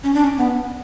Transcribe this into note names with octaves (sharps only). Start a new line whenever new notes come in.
C#4
D4
C#4
B3